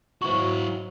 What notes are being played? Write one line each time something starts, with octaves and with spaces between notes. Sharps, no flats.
G#2 F#3 E4 F#4 C5 C#6